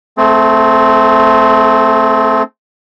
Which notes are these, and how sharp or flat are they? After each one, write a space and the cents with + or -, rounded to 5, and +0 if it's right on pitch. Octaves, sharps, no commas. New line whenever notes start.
A3 +0 C4 +0 G#4 +45